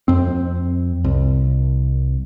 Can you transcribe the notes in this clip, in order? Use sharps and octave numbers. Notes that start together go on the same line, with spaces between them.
F2 C4
C2